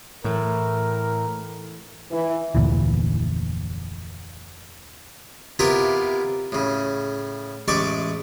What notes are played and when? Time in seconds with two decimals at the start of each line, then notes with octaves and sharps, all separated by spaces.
0.24 A2 E3 A3 A#4
2.11 E3
2.55 F1 D2 A#2 E3
5.59 C3 B3 E4 F4 G4 A#4
6.52 A2 C#3
7.68 A1 G#3 A3 D5 C#6 D6